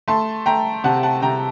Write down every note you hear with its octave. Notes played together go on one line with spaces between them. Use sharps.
A3 A5 C6
A3 G5 A#5
C3 F#5 A5
F#5 A5
C3 G5 A#5